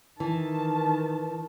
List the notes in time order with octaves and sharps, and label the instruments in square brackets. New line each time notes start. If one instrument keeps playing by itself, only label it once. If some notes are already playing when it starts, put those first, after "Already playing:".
[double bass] D#3 [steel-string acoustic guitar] E3 [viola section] A5